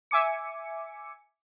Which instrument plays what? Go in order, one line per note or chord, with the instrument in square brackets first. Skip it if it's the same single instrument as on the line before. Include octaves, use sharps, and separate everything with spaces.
[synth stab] E5 G#5 D6 C#7